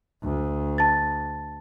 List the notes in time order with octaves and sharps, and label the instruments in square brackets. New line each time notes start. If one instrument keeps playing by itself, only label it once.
[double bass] D2
[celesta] A5 A6